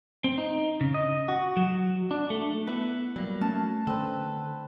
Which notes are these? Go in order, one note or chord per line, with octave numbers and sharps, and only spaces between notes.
C4
D#4
C#3
D#5
F#4
F#3
D4
A3
B3 E4 B4
F#3 G3 A#3
A3 C#4 A5
D3 C4 A4 B4